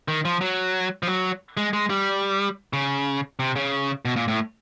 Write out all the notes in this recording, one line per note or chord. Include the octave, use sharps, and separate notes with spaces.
D#3
F3
F#3
F3
F#3
G#3
G#3
G3
C#3
C3
C#3
B2
A#2
A2